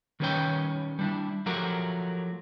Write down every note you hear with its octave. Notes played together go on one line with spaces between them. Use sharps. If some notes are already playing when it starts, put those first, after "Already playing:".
D#3 G3 C#4 B4 C#5 G5
G3 D4 E4
F3 F#3 A3 F#4 G4 A#4